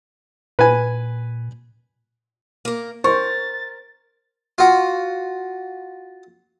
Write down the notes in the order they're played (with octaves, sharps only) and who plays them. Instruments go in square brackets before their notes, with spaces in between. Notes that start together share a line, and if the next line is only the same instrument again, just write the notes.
[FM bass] A#2 [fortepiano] B4 G#5
[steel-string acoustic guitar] A#3 A#4
[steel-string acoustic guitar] A#4 [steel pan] C5 [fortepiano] C#6 [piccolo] A6
[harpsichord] F4 F#4